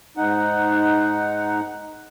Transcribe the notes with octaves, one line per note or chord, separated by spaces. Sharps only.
G#2 D#4 F#5